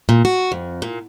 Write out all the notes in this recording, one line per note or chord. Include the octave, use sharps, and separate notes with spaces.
A#2
F#4
F2
A#2